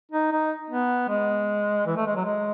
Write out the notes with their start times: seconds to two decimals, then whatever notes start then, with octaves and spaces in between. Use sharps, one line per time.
0.12 D#4
0.31 D#4
0.70 B3
1.08 G#3
1.86 E3
1.96 A3
2.07 G#3
2.16 F#3
2.25 G#3